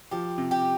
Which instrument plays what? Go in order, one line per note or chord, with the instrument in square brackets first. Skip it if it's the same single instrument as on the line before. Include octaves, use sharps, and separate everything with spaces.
[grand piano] F3 [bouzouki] G4
[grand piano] C3
[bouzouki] G4